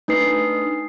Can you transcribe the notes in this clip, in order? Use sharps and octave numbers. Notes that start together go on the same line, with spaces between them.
A3 D4 D#4 B4 D#6 C7